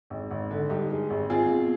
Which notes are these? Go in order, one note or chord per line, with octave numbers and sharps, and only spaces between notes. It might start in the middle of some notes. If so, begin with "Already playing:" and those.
G#1
G#1
D3
G2 D#4 G4
G#3
G#1
C4 F4 G#4
B2